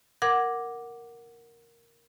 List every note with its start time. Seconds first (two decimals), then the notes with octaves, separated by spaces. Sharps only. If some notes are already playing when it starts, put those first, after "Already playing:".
0.22 A#4 F#5 D6 G#6